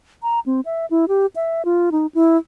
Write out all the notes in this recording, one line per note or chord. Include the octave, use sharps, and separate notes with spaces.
A#5
C4
E5
E4
G4
E5
F4
D#4
E4